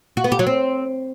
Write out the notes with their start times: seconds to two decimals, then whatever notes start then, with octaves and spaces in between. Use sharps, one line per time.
0.17 F#4
0.24 B3
0.32 G4
0.39 F#3
0.47 C4